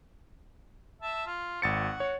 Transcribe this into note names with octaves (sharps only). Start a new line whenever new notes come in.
E5 A5
F4
G#1 F#4 A6 C#7
C#5